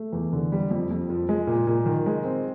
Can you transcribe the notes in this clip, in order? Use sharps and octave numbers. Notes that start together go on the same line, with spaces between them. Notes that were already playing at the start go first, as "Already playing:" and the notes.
Already playing: A3
E2
D3
G3
F2
F2
F3
G#3
A#2
A#2
D#3
G#3
C4